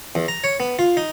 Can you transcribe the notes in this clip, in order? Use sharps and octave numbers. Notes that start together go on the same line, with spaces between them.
E2
A#5
C#5
B3
F4
D#4